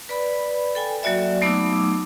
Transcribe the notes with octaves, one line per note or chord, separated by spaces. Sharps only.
B4 D5 B5
A4 G5 G#5
F#3 A#3 F#4 D5 E5
F#3 A3 B3 D#4 D6 E6